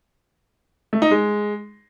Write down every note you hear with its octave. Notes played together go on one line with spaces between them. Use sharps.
A3
D#4
G#3